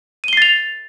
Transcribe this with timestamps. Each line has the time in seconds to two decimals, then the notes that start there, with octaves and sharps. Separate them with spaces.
0.24 D#7
0.28 G7
0.33 C7
0.37 A6
0.42 F7